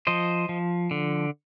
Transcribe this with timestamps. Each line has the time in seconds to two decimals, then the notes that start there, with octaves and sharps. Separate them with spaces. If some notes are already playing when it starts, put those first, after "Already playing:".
0.07 F3 C5 D#5
0.49 F3
0.91 D3